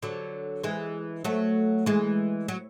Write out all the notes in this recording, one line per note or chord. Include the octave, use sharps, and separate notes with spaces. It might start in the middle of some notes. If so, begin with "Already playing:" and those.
D3 F#3
E3 G#3
F#3 A3
E3 G#3
F#3